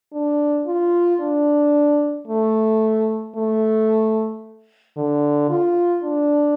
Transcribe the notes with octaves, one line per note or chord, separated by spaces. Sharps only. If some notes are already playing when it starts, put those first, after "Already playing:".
D4
F4
D4
A3
A3
D3
F4
D4